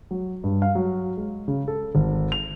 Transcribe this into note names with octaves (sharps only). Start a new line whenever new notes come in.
F#3
G2
F5
F#3
G#3
C#3
A4
G#1
F7